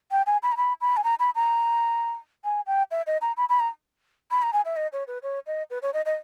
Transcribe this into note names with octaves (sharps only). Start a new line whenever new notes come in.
G5
G#5
B5
A#5
B5
B5
G#5
A#5
B5
A#5
G#5
G5
E5
D#5
A#5
B5
B5
A#5
B5
A#5
G#5
E5
D#5
C#5
B4
C#5
D#5
B4
C#5
D#5
D#5